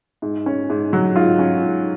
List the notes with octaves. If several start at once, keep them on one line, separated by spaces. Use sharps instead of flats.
G#2
C#4
G#2
F#3
G#2 F4
C#4
G#2